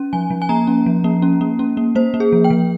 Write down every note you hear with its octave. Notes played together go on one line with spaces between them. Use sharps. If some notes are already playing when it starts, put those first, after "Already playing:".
Already playing: C#4
F3 G#5
F3
G#5
A#3 A#5
C#4
F3
A#3
C#4
A#3
C#4
A#3
A#3 C5
A#3
G#4
F3
G5
F3